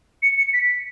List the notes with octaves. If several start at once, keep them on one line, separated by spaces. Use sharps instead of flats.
C#7
C#7
B6